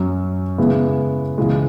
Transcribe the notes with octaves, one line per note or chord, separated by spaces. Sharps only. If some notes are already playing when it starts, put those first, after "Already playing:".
Already playing: F#2 F#3 C#4
C#3 G#3 B3 E4
C#2 C#3 E3 G#3